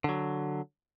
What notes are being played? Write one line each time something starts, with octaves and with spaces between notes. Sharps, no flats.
D3 F#3